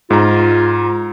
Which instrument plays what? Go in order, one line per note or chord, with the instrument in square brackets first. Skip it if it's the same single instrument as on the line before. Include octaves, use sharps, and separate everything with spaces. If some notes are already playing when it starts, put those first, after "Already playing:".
[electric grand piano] G#2 A#5 [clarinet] F4